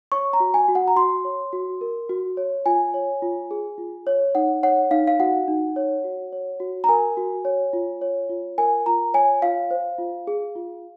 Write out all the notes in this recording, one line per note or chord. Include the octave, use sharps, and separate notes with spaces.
C#5 C#6
A#5
F#4
G#5
F#4
F#5
A#5
F#4 C6
C#5
F#4
A#4
F#4
C#5
F4 G#5
C#5
F4
G#4
F4
C#5
D#4 F#5
C#5 F#5
D#4 F5
F5
F#4 F#5
D#4
C#5
F#4
C#5
F#4
A#5
A#4 G#5
F#4
C#5
F4
C#5
F4
A#4 G#5
F4 A#5
C#5 G#5
F4 F5
C5
F4
G#4
F4